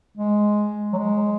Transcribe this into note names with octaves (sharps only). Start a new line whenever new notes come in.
G#3
F#3
G#3